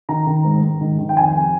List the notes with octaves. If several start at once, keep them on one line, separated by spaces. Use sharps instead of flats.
D#3 A#5
D#3
G#2
G#2
D#3
D#3
G5
F2 G#5
C3